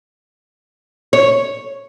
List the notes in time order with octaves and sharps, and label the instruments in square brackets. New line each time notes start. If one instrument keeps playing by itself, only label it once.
[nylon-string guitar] C#5